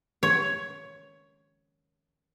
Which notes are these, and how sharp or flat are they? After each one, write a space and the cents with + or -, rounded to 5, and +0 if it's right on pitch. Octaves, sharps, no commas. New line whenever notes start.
C#5 +10